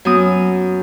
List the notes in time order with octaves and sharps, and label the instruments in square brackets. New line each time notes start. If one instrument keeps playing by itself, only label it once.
[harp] F#2 B3 D#6